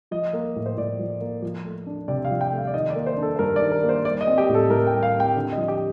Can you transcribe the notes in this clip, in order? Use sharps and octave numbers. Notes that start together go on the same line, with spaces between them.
F3 D#5
A#3
A2
C5
A2 D5
F3
A#3
F3
A3
D4
C3 D5
F5
F3
G5
A3
F5
D5
D#3 D#5
D5
A#3
C5
D4
A4
C5
G2 A#4
D5
D#3
A#4
A#3
C5
G3 D5
D#5
C4
G4
A2
A4
A2 A#4
G5
G3
F5
C4
G5
D3
D#5
F3
G4